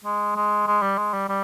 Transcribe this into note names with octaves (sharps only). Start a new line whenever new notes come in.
G#3
G#3
G#3
G3
G#3
G3
G3